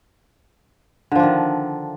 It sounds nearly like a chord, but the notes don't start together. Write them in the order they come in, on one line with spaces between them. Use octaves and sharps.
D3 F3 D4 D#3